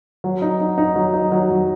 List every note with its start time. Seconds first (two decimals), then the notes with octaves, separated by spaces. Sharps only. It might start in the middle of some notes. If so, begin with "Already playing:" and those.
0.24 F#3
0.42 D#4
0.60 D#4
0.78 D#4
0.96 F#3
1.14 D#4
1.32 F#3
1.50 F#3